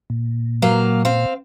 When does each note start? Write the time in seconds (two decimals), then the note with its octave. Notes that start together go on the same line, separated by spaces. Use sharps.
0.10 A#2
0.62 F#3 A#3 F5
1.05 C4 F5